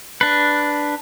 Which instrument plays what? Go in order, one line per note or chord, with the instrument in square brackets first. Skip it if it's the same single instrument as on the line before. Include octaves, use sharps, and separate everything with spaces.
[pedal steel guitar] D4 B4